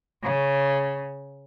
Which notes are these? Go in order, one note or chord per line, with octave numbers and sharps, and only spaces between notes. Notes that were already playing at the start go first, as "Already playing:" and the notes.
C#3